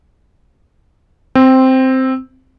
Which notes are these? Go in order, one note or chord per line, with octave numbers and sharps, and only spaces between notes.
C4